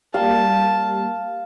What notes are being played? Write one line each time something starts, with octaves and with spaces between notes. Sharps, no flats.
G3 A#3 F5 A5